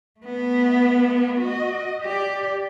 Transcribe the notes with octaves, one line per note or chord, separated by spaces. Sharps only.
A3 B3
F#4 D#5
G4 D5